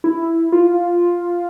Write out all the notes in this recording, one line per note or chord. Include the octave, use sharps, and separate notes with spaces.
E4
F4